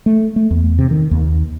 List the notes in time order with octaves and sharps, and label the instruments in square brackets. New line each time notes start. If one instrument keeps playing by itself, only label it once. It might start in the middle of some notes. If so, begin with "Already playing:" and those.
[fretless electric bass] A3
A3
E2
C3
D#3
D#2